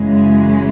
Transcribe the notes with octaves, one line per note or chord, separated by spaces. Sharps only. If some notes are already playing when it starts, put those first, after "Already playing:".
Already playing: F#2 C#3 E3 G#3